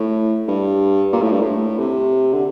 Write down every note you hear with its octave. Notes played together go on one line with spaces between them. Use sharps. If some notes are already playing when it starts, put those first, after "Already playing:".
Already playing: A2
G2
A#2
A2
G2
A2
C3
D3